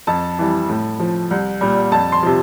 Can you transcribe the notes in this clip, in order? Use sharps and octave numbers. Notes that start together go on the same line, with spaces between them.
F2 A5
E3 G3
A2
F3
C2
A#2 G3
F2 A5
C6
C3 F3